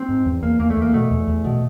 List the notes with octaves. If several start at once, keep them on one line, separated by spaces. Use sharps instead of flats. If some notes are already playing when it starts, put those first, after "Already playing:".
Already playing: C4
G#2
E2
E2 A#3
E2 A#3
A3
E2
A#3
B2 A3
E2
E2
B2